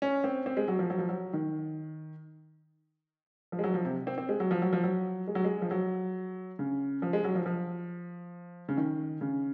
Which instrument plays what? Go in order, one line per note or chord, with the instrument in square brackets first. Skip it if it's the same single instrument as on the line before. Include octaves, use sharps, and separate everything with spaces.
[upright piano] C#4
C4
C4
G#3
F#3
F3
F#3
F3
F#3
D#3
F3
G#3
F#3
F3
C3
C4
C4
G#3
F#3
F3
F#3
F3
F#3
G#3
F#3
G#3
F3
F#3
C#3
F3
G#3
F#3
F3
F3
C#3
D#3
C#3